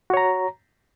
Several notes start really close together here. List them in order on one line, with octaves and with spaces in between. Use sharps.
F#4 C#5 A#5